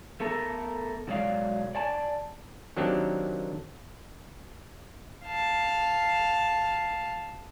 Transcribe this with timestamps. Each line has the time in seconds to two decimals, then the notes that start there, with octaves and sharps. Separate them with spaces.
0.20 A3 B3 A4 A#4
1.08 B2 F#3 G#3 A3 D5 F5
1.75 D5 G#5 A5
2.77 D#3 F#3 A#3 C4 D4 G4
5.26 F5 A5